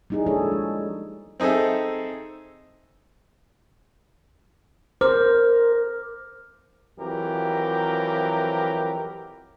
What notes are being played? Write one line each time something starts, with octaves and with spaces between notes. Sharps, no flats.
G3 A#3 D#4 E4 G#4
F3 G#3 D4 G#4 A4 C#5
G#3
C4 D#4 G#4 A4 E5
A#4 C5 D6 F6
F2 E3 F#3 G4 A#4